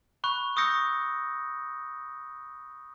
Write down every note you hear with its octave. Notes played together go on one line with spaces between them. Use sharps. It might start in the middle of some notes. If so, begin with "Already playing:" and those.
B5 C#6 F#6
C#6 D#6 E6 G6 A#6 C#7